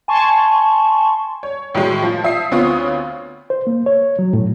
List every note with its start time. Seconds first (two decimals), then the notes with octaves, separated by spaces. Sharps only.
0.08 G#5 A5 C6 C#6
1.43 C#5
1.75 A2 D#3 F#3 G#3
2.02 F3
2.24 F3 E5 D#6 C7
2.51 D2 B3 C4 F4 C#5 D#6
3.50 C5
3.67 A#3
3.86 C#5
4.19 F#3
4.33 A2